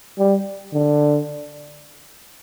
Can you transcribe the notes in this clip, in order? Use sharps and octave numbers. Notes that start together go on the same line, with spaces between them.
G3
D3